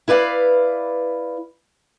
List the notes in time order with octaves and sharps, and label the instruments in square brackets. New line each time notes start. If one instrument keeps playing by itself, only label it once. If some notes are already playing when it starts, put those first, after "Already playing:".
[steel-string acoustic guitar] E4 B4 D5 F5